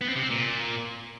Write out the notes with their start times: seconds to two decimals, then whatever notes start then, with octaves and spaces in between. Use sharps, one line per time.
0.01 B3
0.08 C4
0.16 C3
0.23 C4
0.30 A#2